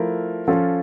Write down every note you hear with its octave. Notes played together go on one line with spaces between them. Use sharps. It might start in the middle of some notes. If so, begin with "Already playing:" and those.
Already playing: F3 A3 E4 A#4
F3 C#4 F4 A4